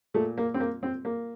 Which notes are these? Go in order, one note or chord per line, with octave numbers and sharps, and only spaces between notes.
A#2 A3
A#3
C4
A#3
C4
A#3